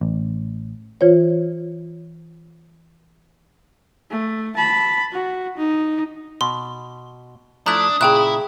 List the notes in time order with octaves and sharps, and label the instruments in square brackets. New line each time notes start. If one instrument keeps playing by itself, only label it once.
[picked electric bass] A1
[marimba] E3 F4 C5 C#5
[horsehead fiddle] A3
A5 B5
F#4
D#4
[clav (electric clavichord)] B2 [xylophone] C6
[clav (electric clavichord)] F3 A3 E4 [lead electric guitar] D4 [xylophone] A#5 F#6 [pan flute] D#6
[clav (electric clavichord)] A#2 C#3 [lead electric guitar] E4 [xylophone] G#4 G5 F#6